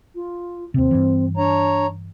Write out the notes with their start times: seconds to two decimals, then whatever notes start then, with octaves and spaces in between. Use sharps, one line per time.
0.15 F4
0.74 D#2 C3 C4
0.91 G2 E3
1.37 D4 C#5 A#5